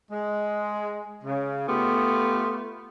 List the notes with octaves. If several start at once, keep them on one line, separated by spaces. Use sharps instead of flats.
G#3
C#3
A3 B3 F4 G4